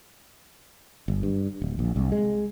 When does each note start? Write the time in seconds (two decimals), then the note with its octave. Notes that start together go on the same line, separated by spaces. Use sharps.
1.08 G1
1.23 G2
1.62 D1
1.79 A#1
1.96 C2
2.12 G#3